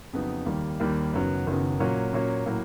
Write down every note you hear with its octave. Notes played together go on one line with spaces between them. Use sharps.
F2 C#3 F#3 B3 D#4
D#2 D#3 G3 A#3
D#2 D#3 G3 A#3
F#1 F#2 D#3 F#3 B3
F#1 F#2 D#3 F#3 B3
A#2 F#3 A#3 C#4
A#2 F#3 A#3 C#4
A2 F#3 A#3